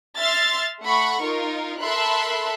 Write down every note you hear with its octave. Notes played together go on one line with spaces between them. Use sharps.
E5 C6 F6 A6
A3 F#5 B5 C#6
D#4 F4 A#4
A4 A#4 E5 B5 C6 F#6